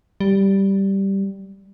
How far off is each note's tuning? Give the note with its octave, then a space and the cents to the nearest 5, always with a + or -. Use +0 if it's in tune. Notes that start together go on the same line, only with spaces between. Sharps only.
G3 -5